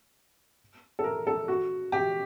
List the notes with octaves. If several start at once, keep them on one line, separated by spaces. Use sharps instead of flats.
A4
A#4
A4
F#4
G4